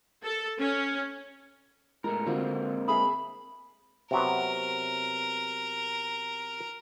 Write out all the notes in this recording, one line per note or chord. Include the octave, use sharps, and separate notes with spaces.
A4
C#4
A2 G#3 A#4
D3 G#3 A#3 C4 F4 F#4
G#4 E5 B5 D#6
C3 F#3 B3 A#4